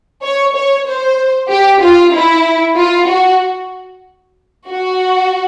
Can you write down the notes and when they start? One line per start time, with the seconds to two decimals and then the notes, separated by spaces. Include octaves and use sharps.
0.23 C#5
0.55 C#5
0.87 C5
1.50 G4
1.82 F4
2.14 E4
2.77 F4
3.10 F#4
4.69 F#4